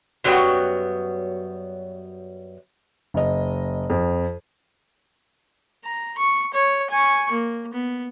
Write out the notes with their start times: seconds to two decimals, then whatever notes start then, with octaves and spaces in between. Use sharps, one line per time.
0.24 F#2 F#3 G3 B3 F#4 G5
3.14 F#1 D#5
3.90 F2
5.85 A#5
6.18 C#6
6.54 C#5
6.90 G#5 C#6
7.31 A#3
7.73 B3